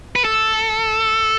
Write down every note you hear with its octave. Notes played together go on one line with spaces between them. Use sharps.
B4
A4